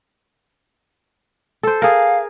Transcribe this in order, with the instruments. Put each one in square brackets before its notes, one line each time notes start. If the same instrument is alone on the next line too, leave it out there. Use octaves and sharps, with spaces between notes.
[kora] A4 C5
[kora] G#4 A#4 [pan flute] F5